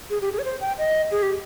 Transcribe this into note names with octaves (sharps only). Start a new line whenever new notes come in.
G#4
G4
G#4
C#5
C5
G5
D#5
G#4
G4